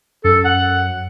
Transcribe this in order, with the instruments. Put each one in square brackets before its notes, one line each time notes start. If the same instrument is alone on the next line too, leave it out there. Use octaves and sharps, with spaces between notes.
[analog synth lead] F#2 [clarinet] A4
[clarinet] F#5